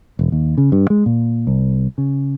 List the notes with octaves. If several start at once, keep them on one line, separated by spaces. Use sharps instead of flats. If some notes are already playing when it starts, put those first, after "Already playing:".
E1
D#2
C#3
G2
G#3
A#2
C2
C#3